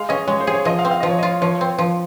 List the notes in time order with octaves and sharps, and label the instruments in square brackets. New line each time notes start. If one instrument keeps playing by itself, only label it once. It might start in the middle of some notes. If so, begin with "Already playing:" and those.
Already playing: [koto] G#3 G#4 [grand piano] F5
[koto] C#4 [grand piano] D#5
[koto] G#3 [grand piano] C#5
[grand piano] C5
[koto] G#4
[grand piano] C#5
[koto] F3 [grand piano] D#5
[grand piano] F5
[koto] C4
[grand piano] F5
[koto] F3 [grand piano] D#5
[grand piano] C#5
[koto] F4 [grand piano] D#5
[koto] F3 [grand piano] C#5
[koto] C4
F3